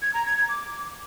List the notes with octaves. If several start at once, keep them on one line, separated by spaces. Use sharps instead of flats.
G#6
A#5
G#6
G#6
D6